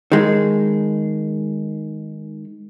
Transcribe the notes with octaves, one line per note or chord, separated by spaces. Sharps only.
D#3 G#3